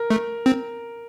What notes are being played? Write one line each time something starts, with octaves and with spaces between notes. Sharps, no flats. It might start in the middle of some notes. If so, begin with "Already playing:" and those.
Already playing: A#4
A3
C4